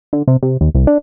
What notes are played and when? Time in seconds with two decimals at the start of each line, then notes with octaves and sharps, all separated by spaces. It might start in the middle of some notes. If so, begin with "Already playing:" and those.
0.13 D3
0.28 C3
0.43 C3
0.61 D#2
0.75 C2
0.87 D4